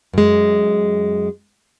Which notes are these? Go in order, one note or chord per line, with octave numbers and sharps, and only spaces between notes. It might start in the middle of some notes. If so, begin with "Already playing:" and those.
F#2 G#3